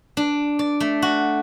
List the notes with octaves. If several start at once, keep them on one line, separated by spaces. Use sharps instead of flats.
D4
D5
A3
F#4